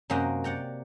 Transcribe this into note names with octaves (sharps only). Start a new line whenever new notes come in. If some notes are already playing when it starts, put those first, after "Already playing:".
F#2 C3 A#3 F#4 D#5 G5
D5 F#5 G5 A#5